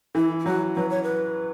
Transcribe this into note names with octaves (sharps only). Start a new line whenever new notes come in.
E3 E4
E4
F#3 F#4
F#3 B4
C#5
B4